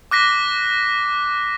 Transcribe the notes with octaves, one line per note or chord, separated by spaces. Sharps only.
D6 F#6 A#6 B6